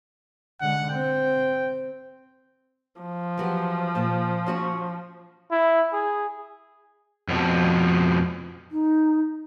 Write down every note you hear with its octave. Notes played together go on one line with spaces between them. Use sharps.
D3 G#3 F#5
C4 G5
F3
E3 F#3 G4
A#2 A5
C#4 F#4 C#5
E4
G#4
F2 B2 E3 F3
D#4